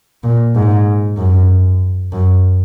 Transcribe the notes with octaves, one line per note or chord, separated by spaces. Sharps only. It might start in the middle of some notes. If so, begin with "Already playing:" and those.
A#2
G#2
F#2
F#2